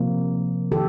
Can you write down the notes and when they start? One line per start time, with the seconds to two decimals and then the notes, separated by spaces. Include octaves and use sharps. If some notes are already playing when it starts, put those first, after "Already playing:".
Already playing: C3 F3 A#3
0.72 D#3 G4 A4